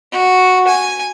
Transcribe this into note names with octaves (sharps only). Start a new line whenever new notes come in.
F#4
G#5